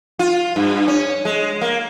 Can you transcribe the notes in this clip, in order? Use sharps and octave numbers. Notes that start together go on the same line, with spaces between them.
F4
G2
C#4
G#3
A#3